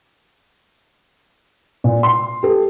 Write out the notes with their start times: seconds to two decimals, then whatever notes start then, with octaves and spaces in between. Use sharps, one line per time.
1.84 A#2
2.03 C6
2.43 G4 A4